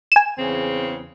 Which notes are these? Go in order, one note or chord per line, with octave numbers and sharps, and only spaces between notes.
G#5 E7
E2 C#3 C4